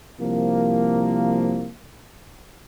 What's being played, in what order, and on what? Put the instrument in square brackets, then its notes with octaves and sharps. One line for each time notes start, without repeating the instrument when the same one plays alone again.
[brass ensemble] C2 F3 A#3